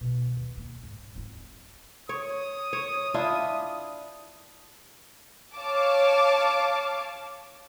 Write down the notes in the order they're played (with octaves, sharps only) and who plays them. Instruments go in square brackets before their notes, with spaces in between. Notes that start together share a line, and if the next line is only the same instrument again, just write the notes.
[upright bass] B2 D#3
D#2 G3
C#2 A#3
G#2
C4 F4
[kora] C#5 [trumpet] D#6
[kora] C#5
D4 E4 F4
[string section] C#5 F5 A5 D6